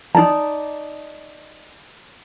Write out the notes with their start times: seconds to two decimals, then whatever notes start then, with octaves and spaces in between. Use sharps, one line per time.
0.15 D#4 D5 A5 A#5